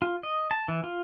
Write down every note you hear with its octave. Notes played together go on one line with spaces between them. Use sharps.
F4
D#5
A5
E3
F4